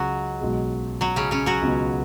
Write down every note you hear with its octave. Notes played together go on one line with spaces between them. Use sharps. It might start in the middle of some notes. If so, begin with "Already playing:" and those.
Already playing: C#2 C#3 F#3 F#4
B1 B2 G#3
F#3 F#4
C#3 C#4
C#3 C#4
F#3 F#4
C#2 B2 B3